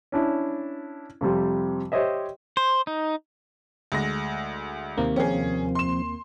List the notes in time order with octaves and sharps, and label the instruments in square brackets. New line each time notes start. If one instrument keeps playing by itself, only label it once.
[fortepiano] C#4 D4 E4
F2 C3 G3
G4 C5 C#5 D#5 E5
[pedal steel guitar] C5
D#4
[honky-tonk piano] D2 G#3 A#6
[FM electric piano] D#2 C3 A#3
[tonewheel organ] F3 C4 [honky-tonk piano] C#4 G#4
[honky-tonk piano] C6 E7